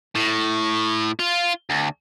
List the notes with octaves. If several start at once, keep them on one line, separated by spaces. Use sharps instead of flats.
A2
F4
D2